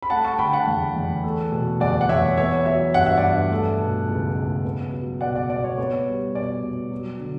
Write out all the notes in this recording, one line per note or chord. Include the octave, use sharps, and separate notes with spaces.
B5
A3 F#5 A5
A5 C#6
D3 G5 B5
F#5 A5
E2
E2
A3
B2
E2 D5 F#5
F#5
E2 C#5 E5
B3 C#5 E5
F#3 C#5 E5
G2 F#5
E5
G2 D5 F#5
A3
B2
C#2
C#2
B3
F#3
B2 D5 F#5
D5
B2 D5
C#5
B3 C#5
G3
B2 D5
B2
F#3
D3